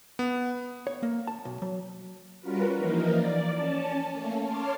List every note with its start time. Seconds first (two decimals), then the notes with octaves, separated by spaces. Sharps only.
0.19 B3
0.87 C#5
1.03 A#3
1.27 A5
1.45 B1
1.62 F#3
2.40 G3 C#4 F4 F#4 A#4 B4
2.76 E3 F3 A#3 D#4 A#4
3.12 D5
3.54 C#4 A5
4.13 A3 A#3 C#4
4.44 C#5 A5 C6 D6 F6